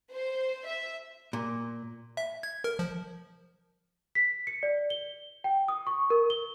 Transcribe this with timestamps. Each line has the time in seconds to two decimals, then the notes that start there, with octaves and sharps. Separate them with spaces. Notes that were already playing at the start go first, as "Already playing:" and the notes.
0.12 C5
0.66 E5
1.33 A#2
2.17 E5
2.43 G#6
2.64 A#4
2.79 F3
4.15 B6
4.47 C#7
4.63 D5
4.90 G7
5.44 G5
5.68 D#6
5.87 C#6
6.10 A#4
6.30 G7